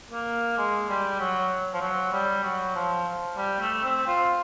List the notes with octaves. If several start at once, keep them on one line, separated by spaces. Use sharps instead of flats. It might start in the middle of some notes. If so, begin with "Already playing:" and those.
A#3
G#3
G3
F#3
F3
F#3
G3
F#3
F3
G3
A3
C4
F4